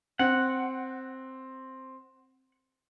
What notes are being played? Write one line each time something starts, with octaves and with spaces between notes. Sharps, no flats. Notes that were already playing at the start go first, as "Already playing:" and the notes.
C4 F#5